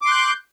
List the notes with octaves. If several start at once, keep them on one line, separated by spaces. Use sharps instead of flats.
C6 D6 F#6 G6